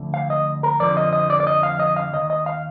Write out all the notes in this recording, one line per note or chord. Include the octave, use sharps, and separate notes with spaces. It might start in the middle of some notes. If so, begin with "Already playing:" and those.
Already playing: D2 D3 F3
F5
D#5
A#4
F2 D3 F3 D5
D#5
D#5
D5
D5
D#5
F5
D#5
F5
D#2 D#3 D#5
D#5
F5